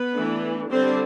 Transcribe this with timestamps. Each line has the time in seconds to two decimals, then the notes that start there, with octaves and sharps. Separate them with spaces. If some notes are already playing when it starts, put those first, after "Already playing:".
Already playing: B3 B4
0.14 E3 A3 D4
0.71 D3 G3 C4 D4 C5